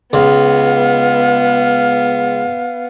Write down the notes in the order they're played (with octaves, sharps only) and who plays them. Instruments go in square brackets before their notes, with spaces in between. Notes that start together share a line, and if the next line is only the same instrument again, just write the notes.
[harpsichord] C#2 [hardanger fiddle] B3 [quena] F5